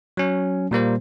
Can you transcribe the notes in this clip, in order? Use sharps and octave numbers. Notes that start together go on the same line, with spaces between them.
F#3 C#4
A#2 G3 A#3 C5